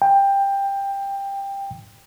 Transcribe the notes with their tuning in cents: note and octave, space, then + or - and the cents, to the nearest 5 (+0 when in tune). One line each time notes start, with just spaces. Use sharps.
G5 +15